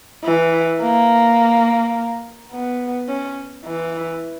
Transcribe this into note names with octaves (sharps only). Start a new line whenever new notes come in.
E3
A#3
B3
C#4
E3